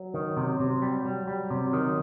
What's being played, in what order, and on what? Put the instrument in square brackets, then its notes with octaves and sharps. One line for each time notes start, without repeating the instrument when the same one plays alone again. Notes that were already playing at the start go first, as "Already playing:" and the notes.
Already playing: [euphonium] F#3
[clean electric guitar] D#3
C3
[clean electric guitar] C3 [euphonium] F#3
[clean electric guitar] G3
G3
G3
C3
D#3